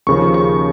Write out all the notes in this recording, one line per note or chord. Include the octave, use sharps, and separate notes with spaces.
D#2 C#3 F3 C#6
C#6